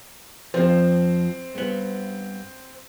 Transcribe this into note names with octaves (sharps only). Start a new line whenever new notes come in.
F2 F3 C4 C5
G2 B3